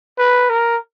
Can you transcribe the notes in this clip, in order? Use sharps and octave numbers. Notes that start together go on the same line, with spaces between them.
B4
A#4